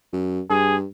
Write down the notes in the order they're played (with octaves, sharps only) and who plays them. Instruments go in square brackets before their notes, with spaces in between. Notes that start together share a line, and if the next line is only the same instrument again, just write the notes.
[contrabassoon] F#2
[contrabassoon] G2 [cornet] G#4